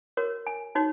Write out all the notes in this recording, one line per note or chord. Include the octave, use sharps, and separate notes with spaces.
F#4 A#4 C#5
G#5
D#4 F#4 C#5